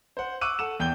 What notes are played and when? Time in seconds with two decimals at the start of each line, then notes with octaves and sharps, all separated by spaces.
0.17 C5 F#5
0.41 C#6 D6 E6 F#6 D#7
0.59 A4 F#5 E7
0.80 E2 G5 G6 G7